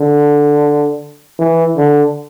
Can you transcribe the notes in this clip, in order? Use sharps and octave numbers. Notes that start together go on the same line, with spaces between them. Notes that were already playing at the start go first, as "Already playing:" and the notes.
Already playing: D3
E3
D3